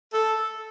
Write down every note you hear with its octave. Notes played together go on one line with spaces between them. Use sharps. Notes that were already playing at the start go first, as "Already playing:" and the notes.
A4